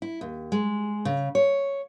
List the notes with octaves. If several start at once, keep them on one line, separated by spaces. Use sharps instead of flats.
E4
D#2
G#3
C#3
C#5